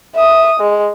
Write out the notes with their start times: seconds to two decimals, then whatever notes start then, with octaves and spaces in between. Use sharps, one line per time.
0.15 E5 D#6
0.60 G#3